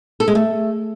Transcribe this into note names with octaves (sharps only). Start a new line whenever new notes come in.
A4
G#3
A3